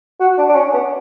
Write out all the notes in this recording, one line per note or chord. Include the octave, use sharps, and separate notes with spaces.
F#4
D4
D4
C#4
B3